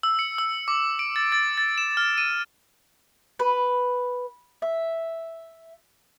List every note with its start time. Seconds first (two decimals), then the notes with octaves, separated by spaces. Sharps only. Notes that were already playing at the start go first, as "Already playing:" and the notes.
0.03 E6
0.19 C#7
0.38 E6
0.68 D6
0.99 D7
1.16 A6
1.32 A6
1.58 A6
1.78 E7
1.97 F6
2.18 D#7
3.39 B4
4.62 E5